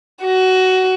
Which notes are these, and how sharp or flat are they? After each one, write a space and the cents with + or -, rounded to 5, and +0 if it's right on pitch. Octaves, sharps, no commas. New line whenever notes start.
F#4 +15